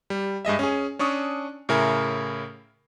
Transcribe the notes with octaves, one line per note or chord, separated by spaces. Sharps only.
G3
G2 G#3 D#5 E5
C#4 G#4
C#4 D4 C#6 D#6
A2 C#3 E4 A#4 G#5